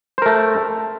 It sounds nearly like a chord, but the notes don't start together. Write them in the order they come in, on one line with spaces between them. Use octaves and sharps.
C5 A#4 A3